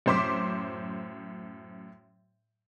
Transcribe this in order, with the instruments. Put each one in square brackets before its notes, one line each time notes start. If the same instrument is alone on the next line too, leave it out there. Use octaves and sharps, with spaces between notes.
[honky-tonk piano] F#2 A2 C5 C6 D6 B6